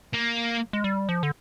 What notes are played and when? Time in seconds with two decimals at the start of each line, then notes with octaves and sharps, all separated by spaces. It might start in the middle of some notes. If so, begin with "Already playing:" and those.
0.14 A#3
0.73 G#3
0.84 G3
1.09 F3
1.23 D3